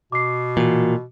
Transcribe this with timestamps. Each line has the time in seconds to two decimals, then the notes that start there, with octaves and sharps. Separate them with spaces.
0.12 B2 D6 C7
0.57 A#2 E3 F#4